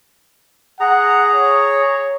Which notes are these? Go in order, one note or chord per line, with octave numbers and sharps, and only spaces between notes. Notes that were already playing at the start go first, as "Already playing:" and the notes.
G#4 F#5 A#5
C#5